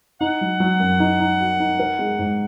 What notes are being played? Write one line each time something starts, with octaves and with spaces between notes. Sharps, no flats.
D#4 F#5
F#3
F#3
F#2
D#4
D#4
F#4
D#4
A#4
G#3
G#2